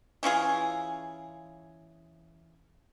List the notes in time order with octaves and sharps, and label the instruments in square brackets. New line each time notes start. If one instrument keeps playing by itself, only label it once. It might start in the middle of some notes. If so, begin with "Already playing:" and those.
[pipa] E3 C#4 F4 G#4